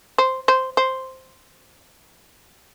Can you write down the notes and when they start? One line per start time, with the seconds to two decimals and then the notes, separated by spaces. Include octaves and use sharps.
0.18 C5
0.48 C5
0.77 C5